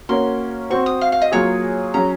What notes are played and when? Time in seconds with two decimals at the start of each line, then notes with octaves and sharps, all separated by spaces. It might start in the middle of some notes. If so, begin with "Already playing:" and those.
0.09 A#3 C#4 F#4 A#4 C#5 C6
0.70 C4 F#4 C5 C#6
0.86 D#6
1.01 F5
1.12 F5
1.22 D#5
1.32 F#3 A#3 F4 G#4 C#5
1.94 F#3 C#4 G#4 A#5